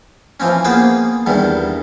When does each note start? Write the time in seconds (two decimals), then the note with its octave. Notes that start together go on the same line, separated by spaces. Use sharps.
0.40 E3 F3 C4 C#4
0.64 A#3 B3 G#4 C5 F#5 G5
1.26 E2 G2 D#3 G3